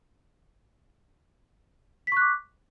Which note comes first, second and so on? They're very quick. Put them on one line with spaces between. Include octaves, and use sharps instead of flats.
B6 C#6 F#6 D6